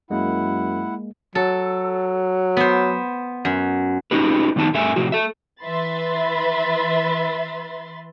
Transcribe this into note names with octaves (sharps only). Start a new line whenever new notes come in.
F#2 G#3 A#3 E4 F#5
F#3 A4
B3 C5
F#2
C#4 D#4 F#4 G4 B4
F2 D#3 B3 D#4 A5
G2 A3 A#4 E5 G#5
A2 C3 F3 F#4
A3 A4 E5
E3 B4 E5 B5 C6 A6